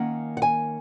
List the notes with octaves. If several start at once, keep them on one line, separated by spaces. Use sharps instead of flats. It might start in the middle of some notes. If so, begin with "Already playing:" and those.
Already playing: D#3 A#3 C#4 F#5
F#5
G#5